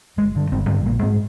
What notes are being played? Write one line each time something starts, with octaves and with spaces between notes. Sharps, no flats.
G1 G#3
G2 D3
G1 C4
G2 D3 C4
A#1 A#3
G#2 C4